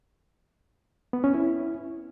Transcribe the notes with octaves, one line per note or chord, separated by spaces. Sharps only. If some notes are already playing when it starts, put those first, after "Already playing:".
B3
C#4
E4